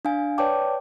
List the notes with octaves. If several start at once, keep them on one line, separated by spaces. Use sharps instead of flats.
D4 F5 G#5
B4 C#5 D5 G5 A5 D6